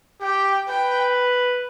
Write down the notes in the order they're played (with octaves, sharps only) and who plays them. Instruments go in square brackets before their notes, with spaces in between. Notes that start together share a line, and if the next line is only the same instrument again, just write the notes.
[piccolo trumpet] G4 [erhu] G5
[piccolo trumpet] B4 [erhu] G5